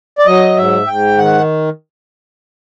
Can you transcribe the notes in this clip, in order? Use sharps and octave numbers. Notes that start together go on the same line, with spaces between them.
D5
F#3 D#5
G#2 E5
G#2 G5
D#3 F#5